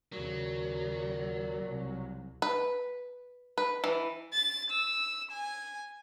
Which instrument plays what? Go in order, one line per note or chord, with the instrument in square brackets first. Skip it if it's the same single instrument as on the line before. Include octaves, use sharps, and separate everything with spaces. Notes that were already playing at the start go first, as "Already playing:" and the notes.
[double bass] D#2 C#3 [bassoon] A#2 [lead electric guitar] F#3
[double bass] C2
[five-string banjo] B4
B4
E3
[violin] A6
E6
G#5